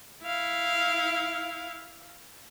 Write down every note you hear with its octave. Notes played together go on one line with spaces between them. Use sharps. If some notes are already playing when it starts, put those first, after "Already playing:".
E4 F5